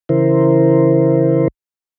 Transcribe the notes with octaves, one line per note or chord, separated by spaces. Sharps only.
C#3 E3 E4 A#4 C5